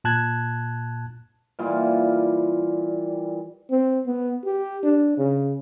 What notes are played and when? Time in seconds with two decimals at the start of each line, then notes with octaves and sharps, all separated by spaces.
0.04 A#2 A5 F#6 G#6
1.59 A#2 E3 G3 F4
3.71 C4
4.06 B3
4.44 G4
4.83 D4
5.18 C#3